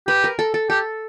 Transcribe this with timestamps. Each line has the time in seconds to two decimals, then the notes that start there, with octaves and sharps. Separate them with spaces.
0.08 G4 B4
0.24 A#4
0.39 A4
0.54 A4
0.70 G4 A4